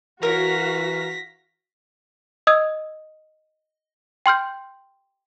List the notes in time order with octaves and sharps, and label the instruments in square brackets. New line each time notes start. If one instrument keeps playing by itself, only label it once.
[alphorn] E3 [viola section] F#4 F5 [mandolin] A#4 C#5 [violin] A#6 B6
[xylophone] D#5 D#6 E6 G#6
G5 C6 F6 G6